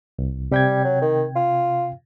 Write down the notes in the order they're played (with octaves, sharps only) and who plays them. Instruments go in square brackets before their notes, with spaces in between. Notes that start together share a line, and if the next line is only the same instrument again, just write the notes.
[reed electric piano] C2
[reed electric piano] C3 G5 G#6 [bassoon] G3
[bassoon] F#3
D#3
F4